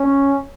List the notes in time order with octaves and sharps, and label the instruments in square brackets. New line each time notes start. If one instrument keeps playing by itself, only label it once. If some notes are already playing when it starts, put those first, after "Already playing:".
Already playing: [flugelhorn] C#4